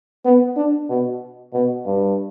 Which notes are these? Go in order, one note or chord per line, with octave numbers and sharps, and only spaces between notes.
B3
D4
B2
B2
G2